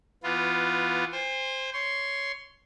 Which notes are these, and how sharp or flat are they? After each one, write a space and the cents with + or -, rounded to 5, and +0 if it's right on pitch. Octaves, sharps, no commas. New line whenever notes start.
E3 +20 B3 +0 F4 +10
C5 +5 G#5 -45
C#5 +10 C6 +0